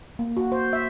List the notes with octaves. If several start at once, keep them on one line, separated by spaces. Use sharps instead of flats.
A#3
F#4
C5
E5